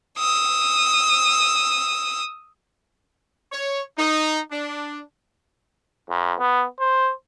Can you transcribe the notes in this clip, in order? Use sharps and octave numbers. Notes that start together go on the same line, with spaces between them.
D#6 E6
C#5
D#4
D4
F2
B3
C5